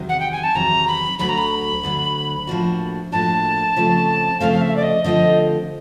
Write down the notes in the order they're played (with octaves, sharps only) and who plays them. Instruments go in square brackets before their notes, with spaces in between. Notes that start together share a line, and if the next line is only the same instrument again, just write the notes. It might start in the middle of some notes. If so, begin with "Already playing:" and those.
Already playing: [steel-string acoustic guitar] E2 C3 D#3 F#3
[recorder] F#5
G5
G#5
A5
[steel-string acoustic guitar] E2 C3 D#3 F#3 [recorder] A#5
[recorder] B5
[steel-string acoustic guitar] D2 D3 F#3 [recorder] B5
[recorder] A#5
B5
[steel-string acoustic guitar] D2 D3 F#3
A2 F3 A#3 D4 F#4
[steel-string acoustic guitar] A2 F3 A#3 D4 F#4 [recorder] A5
[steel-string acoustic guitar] C#3 F3 A3 C4
[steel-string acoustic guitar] C#3 F3 A3 C4 [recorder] F5
[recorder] F5
E5
D5
D#5
[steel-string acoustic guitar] D3 F3 A3 C4 F4 [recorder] D#5